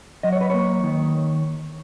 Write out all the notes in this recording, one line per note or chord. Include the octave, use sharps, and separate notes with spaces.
F#3 D#5
C#5
B4
A#3 C#5
D#3